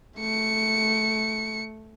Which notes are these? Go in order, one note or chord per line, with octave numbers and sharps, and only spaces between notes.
A3 C#7